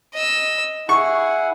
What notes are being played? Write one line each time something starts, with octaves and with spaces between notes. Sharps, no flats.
D#5 E6
E4 G#4 F#5 C#6